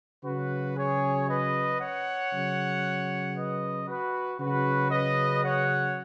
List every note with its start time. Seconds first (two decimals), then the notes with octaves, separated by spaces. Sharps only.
0.25 C#3 F#3 F#4 B4
0.77 G#4 C#5
1.29 B4 D#5
1.80 C#5 F#5
2.33 C#3 F#3
3.36 B4 D#5
3.88 F#4 B4
4.40 C#3 F#3 F#4 B4
4.92 B4 D#5
5.44 C#5 F#5